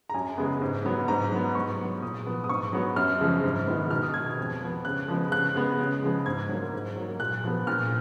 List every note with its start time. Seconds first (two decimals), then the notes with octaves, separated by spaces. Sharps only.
0.09 A#5
0.14 F#2 G#5
0.38 C#3 G#3 B3
0.62 G#2
0.85 F#3 B3
1.08 G#2 A#5
1.32 F#3 B3
1.55 G#2 C#6
1.79 F#3 B3
2.02 A#2 D#6
2.26 F3 B3
2.44 D#6
2.49 G#2 C#6
2.73 F#3 B3
2.96 F#2 F6
3.20 C#3 F3 G#3
3.44 G#2
3.67 D#3 G#3 B3
3.91 B2 F6
4.03 D#6
4.14 G#3 B3 G#6
4.26 G#6
4.38 F2
4.61 F3 B3
4.85 C#3 F#6
5.08 F3 G#3 B3
5.32 C#3 F#6
5.55 G#3 B3
5.79 C#3
6.03 F3 G#3 B3
6.26 G#2 G#6
6.49 F#3 A#3
6.73 G#2
6.96 F#3 A#3
7.19 A#2 F#6
7.44 F3 B3
7.67 A#2 F6